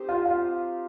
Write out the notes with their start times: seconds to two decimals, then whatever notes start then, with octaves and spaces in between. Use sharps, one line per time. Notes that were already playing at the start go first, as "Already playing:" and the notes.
Already playing: C4 D#4 G4 C5
0.09 F4
0.26 F4